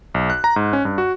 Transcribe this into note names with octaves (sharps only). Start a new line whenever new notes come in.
B1
F#6
A#5
G#2
C#4
G2
F#4